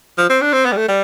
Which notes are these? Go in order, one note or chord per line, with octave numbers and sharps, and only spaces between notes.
F3
C4
D4
C4
B3
G3
A3
G3